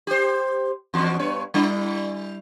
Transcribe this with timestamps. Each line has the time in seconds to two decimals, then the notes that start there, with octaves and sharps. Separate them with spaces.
0.07 G4 C5
0.94 E2 F#4
1.19 G2 B3 C#5
1.54 G3 D4 E4